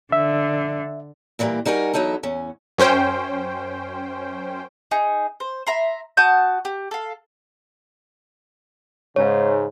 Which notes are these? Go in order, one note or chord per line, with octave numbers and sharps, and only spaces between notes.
D3 E5
A#2 E3 F#3 G3 A#3
G3 D#4 F#4 A#4 G#5
E2 F#3 D#4 E4 A4
E2 C#4
F#2 C#4 C5 G5
D#4 G#4
C5
E5 A#5 C6
F#4 A5 D#6 G6
G4
A4 F5
G#2 C#3 C#5